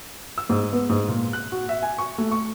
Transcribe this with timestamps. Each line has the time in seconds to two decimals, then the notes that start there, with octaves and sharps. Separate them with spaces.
0.38 E6
0.49 G#2
0.72 B3
0.89 G#2
1.08 A#2
1.33 F#6
1.52 F#4
1.69 E5
1.83 G#5
1.98 C#6
2.18 A3
2.31 C#6